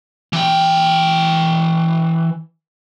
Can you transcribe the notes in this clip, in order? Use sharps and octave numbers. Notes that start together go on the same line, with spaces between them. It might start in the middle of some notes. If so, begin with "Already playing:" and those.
E3 G5